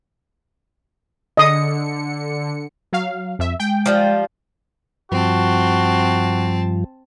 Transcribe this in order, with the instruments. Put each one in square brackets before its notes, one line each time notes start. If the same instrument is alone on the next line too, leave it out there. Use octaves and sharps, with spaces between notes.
[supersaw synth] D3 C#7 [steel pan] D#5 D#6
[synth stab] F#3 F5
F2 E5
[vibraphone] G#3 [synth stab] G5
[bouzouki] F3 G3 F4
[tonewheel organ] G2 F3 [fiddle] C4 A5 [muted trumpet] F#4